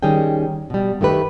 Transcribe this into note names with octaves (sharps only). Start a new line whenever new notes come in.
D#3 G3 C#4 G#4 G5
B2 G3
G2 D#3 A3 G4 B4